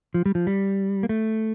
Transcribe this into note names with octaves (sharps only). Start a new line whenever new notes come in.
F3
G3
F3
G3
A#3
A3